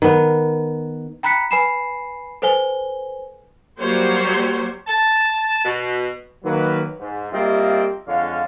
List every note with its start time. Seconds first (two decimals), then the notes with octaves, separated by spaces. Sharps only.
0.02 D#3 B3
1.23 G5 A#5 B5 F#6 B6 C#7
1.51 B4 G#5 B5 C7 E7
2.42 A4 B4 C5 G#5 G7
3.79 F#3 G3 A#3 C5 C#5
4.87 A5
5.64 B2
6.44 D#3 F#3 A#3 B4
7.00 G#2
7.31 G3 A#3 C4 F4 D#5 E5
8.07 F2 D3 G#3 F4 C#5 F5